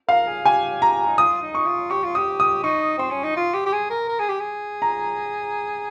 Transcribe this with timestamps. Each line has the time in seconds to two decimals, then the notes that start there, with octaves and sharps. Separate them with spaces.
0.09 A#4 F5
0.27 G#4
0.45 G4 G#5
0.82 A#5
1.07 D#4
1.18 F4 D#6
1.42 D#4
1.55 C#6
1.67 F4
1.91 G4 C#6
2.04 F4
2.15 G4 D#6
2.40 D#6
2.63 D#4 C#6
2.98 C4 C6
3.10 C#4
3.23 D#4
3.36 F4
3.54 G4
3.66 G4
3.73 G#4
3.90 A#4
4.09 A#4
4.19 G#4
4.29 G4
4.40 G#4
4.82 A#5